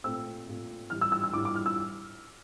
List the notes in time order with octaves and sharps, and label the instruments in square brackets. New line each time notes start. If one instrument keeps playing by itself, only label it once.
[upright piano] A#2 A3 C4 E6
A#2 A3 C4
A2 E3 G3 F6
E6
E6
E6
A2 E3 G3 D6
D6
F6
E6